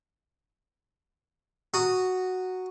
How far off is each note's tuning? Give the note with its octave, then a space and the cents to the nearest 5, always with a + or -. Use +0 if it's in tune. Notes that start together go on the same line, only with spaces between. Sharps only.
F#4 +0 A#5 -20 D#6 +0